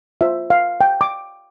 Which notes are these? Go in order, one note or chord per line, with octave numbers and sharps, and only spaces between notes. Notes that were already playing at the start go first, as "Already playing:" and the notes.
F4 C5 E5
F5
G5
D6